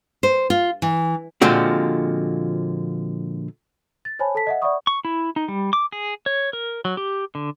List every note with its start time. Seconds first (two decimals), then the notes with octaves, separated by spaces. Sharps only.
0.23 C5
0.50 F4
0.82 E3
1.42 A#2 D3 F3 G#3 C4 F#4
4.05 A6
4.19 C5 C#5 G#5 A5 B5
4.35 A4 A5 B6
4.47 D#5 E5 F#5
4.62 D5 E5 F#5 B5 C#6 D#6
4.87 C#6
5.05 E4
5.36 D#4
5.48 G3
5.73 D6
5.92 G#4
6.26 C#5
6.53 A#4
6.85 F#3
6.97 G4
7.35 D3